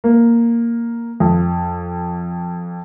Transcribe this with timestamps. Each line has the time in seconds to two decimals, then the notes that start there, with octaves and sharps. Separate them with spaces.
0.04 A#3
1.20 F2